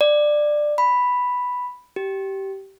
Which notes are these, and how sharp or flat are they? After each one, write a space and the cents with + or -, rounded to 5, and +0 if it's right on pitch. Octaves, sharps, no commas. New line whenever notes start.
D5 +15
B5 +0
G4 -20